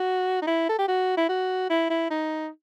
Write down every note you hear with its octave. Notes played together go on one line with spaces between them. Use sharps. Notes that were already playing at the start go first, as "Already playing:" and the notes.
Already playing: F#4
D#4
E4
A4
G4
F#4
E4
F#4
E4
E4
D#4